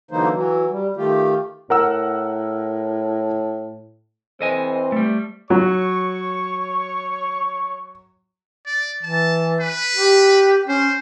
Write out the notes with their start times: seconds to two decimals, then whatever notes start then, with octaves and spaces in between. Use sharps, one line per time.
0.11 D3 E3 F#3 A#3 D#4 C5
0.33 E3 F#3
0.71 G3
0.96 D#3 A3 F4 G4
1.70 A2 A#4 F#5 E6
4.41 E3 C4 A4 C5 D#5 G#5
4.92 G3 A3
5.50 F#3 C#5 C#6
8.66 D5
9.03 E3 A5
9.60 B4
9.96 G4
10.68 C#4 C5